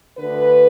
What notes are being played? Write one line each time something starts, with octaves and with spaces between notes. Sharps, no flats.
D2 D3 B4